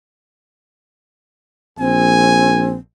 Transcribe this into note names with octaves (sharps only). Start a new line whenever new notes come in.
A#1 C4 G#5